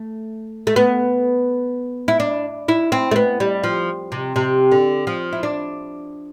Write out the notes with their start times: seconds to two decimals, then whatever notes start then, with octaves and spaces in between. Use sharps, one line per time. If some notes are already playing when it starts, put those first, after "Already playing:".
Already playing: A3
0.67 A3
0.76 B3
2.08 E4
2.20 D4
2.68 E4
2.92 C4
3.11 A3
3.16 B3
3.40 G3
3.64 F3
4.12 C3
4.36 C3
4.72 D3
5.07 F3
5.33 E4
5.43 D4